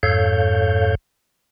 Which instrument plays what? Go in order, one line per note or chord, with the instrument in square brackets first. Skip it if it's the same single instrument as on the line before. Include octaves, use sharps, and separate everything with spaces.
[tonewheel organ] F2 G#2 A4 C#5 F5 G6